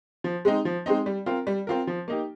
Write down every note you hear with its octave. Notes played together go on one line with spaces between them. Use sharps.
F3
G#3 C4 D#4
F3
G#3 C4 D#4
G3
C4 F4 A#4
G3
C4 F4 A#4
F3
A#3 D#4 G4